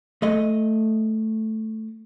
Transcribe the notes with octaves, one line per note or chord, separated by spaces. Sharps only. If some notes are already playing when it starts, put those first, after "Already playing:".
A3 D#5